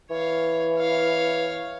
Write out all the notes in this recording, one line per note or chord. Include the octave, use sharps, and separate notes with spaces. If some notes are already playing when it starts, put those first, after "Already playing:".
E3 C#5 F5
C#5 F5